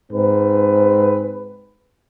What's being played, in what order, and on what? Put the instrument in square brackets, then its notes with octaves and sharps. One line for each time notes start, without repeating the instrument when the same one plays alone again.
[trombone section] G#2 C4 B4